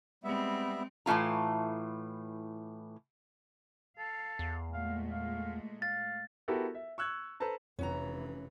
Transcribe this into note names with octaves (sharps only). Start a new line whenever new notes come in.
G3 G#3 B3 C4 E5
A2 E3 A3 F4 A#5
A4 F5
E2
A#2 G#3 A3 F5
F5
F5 A6
B3 E4 F#4 G4 A4 A#4
E5
C#6 E6 F#6 G#6
A4 B4 C5 A5 A#5
F1 F2 E3 C#4 F#5 A#5